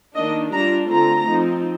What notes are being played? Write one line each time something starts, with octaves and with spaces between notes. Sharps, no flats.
D#3 A#3 D4 D#5
G3 D4 F4 A#5
D3 A3 C4 F4 A#5
F3 C4 D#4